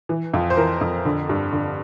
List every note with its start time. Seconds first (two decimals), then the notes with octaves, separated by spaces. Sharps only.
0.09 E3
0.34 F2 F4
0.50 C5
0.57 E3 A#4
0.81 F2
1.05 D3
1.29 G2
1.53 D3